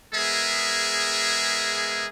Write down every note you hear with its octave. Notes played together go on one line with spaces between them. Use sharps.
G#3 B3 G#4 A#4 E5